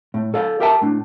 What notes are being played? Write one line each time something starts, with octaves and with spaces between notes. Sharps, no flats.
A2
A4 D5 F5
G4 A#4 E5 G5 A5
A2 D4